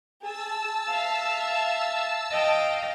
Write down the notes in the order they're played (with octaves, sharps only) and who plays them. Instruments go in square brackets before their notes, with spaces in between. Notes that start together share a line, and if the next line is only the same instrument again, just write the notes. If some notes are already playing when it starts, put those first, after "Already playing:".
[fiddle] G#4 [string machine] A5 E6
[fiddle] E5 F5
[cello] D#5 G5 [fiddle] F5